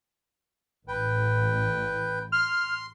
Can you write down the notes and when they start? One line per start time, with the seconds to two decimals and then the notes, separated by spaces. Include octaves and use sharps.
0.88 A1 B4 G5
2.32 C6 F6